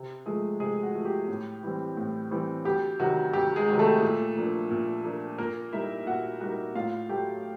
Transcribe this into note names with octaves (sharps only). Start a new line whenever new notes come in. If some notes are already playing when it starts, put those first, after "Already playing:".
Already playing: C3
F3 G#3 A3 G#4
C3 G#3 G#4
F#4
F3 A3
G4
A2
E3 G3 C4
A2
E3 G3 C4
D2 G4
C3 D#3 F#3 F#4
D2 G4
G#3 G#4
C3 D#3 F#3
A3 A4
A#2
F3 A#3 D4
A#2
F3 A#3 D4
A#2 A#3 A#4
G3 A#3 D#4 E4 E5
A#2 F#4 F#5
G3 A#3 D#4 F#4 F#5
A2 F4 F5
F#3 A3 G4 G5